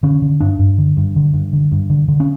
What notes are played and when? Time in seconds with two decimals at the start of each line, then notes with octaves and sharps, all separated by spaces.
0.03 D3 C#4
0.22 D3
0.40 G2 D4
0.59 G2
0.78 D3
0.97 G2
1.16 D3
1.34 G2
1.53 D3
1.72 G2
1.90 D3
2.08 D3
2.20 C#4